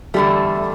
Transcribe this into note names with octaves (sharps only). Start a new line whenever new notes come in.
E2 D3 G3 A3